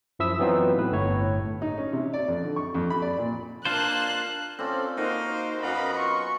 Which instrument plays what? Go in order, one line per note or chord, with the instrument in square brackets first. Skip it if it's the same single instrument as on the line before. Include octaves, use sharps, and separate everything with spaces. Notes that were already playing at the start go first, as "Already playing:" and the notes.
[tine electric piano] F#2 F3 E4 E5 D#6 E6
E3 F#3 B3 C4 D#4 F4
A2 A3 B4
G1 A2 E4 C#5
[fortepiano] D#4
C#4
C3
D5
F2
D3
C#6
F2
B5
D5
A#2
[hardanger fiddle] A#3 A5 [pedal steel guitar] D4 F4 C5 [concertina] F5 [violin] F#6
[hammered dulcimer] C4 F4 [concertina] C#4 A4 D5
[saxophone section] A#3 D#4 [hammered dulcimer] F#4 [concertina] A#4 F5 [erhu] C5
[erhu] C5
[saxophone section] F#2 B3 D#5 [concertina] F5 F#5 A#5 [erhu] B5
[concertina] F4 [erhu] C#6